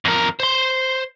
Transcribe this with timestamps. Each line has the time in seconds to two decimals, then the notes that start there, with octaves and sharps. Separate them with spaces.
0.05 F2 A#4
0.40 C5 C6